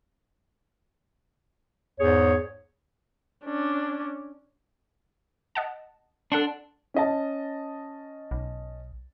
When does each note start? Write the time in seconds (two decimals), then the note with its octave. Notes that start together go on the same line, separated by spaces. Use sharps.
1.99 E2 G#2 G#4 C#5
3.45 C#4 D4
5.55 D#5 F#5 A5
6.32 D4 A4 F#5 C6
6.94 C#4 D#5 A5
8.31 B1